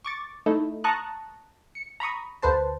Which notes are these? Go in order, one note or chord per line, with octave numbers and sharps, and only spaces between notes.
C#6 D6 A6
A3 D#4 E4
A5 A#5 C#6 D#6 F#6
C#7
A#5 B5 C#6 D#6
D2 B4 C5 A5